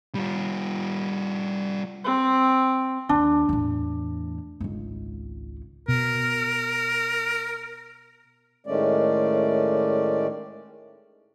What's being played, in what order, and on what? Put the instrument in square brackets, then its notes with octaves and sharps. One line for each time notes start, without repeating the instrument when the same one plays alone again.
[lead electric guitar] G3 F4
[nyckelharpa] C4
[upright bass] D#2 [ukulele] D4
[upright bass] E2 A2
G#1 C#2
[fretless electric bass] B2 [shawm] A#4
[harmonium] A2 D#3 G#3 A3 C#4 D5